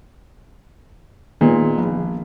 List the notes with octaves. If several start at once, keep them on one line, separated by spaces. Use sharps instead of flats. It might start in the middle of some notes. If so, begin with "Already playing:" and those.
A#2 D#3 G#3 B3
A#1